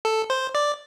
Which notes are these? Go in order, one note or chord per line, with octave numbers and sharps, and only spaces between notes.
A4
C5
D5